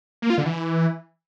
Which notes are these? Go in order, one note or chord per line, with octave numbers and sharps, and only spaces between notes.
A#3
F4
D3
E3